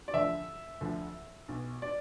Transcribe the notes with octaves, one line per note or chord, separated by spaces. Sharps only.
D5
D2 D3 F3 E5
D2 D3 F3
B1 B2
D5